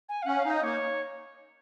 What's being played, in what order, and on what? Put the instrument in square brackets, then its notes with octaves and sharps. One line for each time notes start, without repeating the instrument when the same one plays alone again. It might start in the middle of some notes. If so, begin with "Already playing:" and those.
[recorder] G#5
F5
[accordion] C#4 [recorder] F#5
[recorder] F5
[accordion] D#4
[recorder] D#5
[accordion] A#3 [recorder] C#5